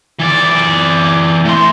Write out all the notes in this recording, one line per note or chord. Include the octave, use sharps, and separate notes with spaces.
E3 D5
A3 C6